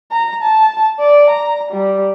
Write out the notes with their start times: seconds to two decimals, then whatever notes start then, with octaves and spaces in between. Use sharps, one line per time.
0.11 A#5
0.42 A5
0.99 D5
1.30 A#5
1.71 G3